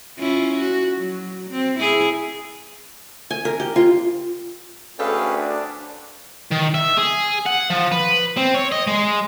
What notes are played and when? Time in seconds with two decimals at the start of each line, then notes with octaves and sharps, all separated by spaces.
0.18 C#4 E4 F4
0.59 F#4
0.95 F#3
1.50 C4
1.79 E4 G#4
3.31 G#5
3.45 A#4
3.60 G4
3.76 F4
4.99 D2 C#4 G#4 A4 B4 F5 G5
5.40 D4
6.51 D#3
6.74 E5
6.97 G#4
7.46 F#5
7.70 F3
7.92 B4
8.37 C4
8.54 C#5
8.72 D#5
8.87 G#3